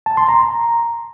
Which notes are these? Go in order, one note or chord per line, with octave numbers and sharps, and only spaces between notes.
A5
C6
A#5